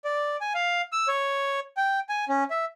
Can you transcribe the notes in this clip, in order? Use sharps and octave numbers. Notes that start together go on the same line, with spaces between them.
D5
G#5
F5
E6
C#5
G5
G#5
C#4
E5